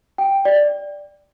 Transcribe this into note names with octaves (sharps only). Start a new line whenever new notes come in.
G5
D5